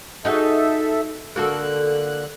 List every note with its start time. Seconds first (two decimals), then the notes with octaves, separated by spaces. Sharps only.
0.25 D#4 F#4 G#4 A4 E5
1.36 D3 A#3 F#4 A4 F#6